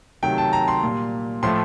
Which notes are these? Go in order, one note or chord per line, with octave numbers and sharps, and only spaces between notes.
C3 D#3 F#3 A3 G5
A5
A#5
C6
A#2 G3
A2 F3 A3 C6